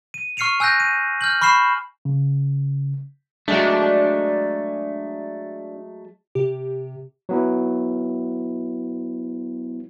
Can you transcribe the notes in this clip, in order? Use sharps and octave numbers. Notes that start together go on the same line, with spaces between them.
D#7
C#6 F6 C7 C#7 D#7 F7
G#5 E6 F#6 G6 A#6
D#7
F6 G6 F#7
B5 C#6 F6 C7 E7
C#3
F#3 G#3 A3 D4
C3 G4
F#3 B3 E4